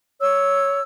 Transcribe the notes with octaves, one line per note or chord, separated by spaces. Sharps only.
C#5 E6